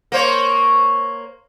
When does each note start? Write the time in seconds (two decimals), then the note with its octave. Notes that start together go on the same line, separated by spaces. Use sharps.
0.12 A#3 C5 C#5